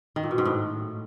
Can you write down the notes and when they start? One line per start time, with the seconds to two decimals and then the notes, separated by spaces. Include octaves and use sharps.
0.16 D#3
0.23 A#2
0.31 B2
0.38 G#2
0.45 A2